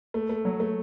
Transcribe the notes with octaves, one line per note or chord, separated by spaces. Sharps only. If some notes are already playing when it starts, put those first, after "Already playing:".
A3
A3
F#3
A3